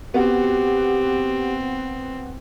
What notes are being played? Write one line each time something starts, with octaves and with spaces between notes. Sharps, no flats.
B3 C4 F#4 G4